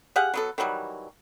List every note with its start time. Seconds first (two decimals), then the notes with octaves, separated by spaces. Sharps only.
0.16 G4 G#4 F5 F#5
0.34 F#3 B3 A4
0.58 D#3 E3 F#3 G3